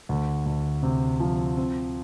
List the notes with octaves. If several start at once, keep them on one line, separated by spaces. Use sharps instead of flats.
D2
D2
C3
F3
C4